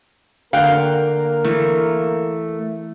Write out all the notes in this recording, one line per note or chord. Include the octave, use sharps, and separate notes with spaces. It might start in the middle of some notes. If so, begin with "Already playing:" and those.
D3 A#3 A#4 F5 G5 C6 F#6
E3 A3